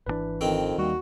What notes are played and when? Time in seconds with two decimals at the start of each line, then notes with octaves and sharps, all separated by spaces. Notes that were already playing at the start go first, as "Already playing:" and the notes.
0.06 G#1 C3 E3 D4 B4
0.41 F2 D#3 C4
0.78 D#2 G3 A#3 F#4